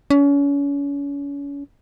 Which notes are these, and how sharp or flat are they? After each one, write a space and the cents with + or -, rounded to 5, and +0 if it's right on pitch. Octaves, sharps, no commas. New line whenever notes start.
C#4 +35